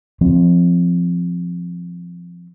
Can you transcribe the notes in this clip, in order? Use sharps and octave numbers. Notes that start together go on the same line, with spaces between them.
F3 C4